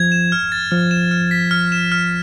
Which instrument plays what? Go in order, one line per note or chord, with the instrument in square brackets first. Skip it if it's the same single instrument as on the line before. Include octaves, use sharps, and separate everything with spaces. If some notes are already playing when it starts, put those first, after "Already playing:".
Already playing: [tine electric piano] F3 [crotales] G#6
[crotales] E7
F6
A6
[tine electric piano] F3 [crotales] F6
[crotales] E7
F6
B6
F6
E7
F6